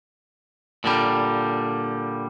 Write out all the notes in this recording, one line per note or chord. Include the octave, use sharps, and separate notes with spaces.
A#2 D3 G3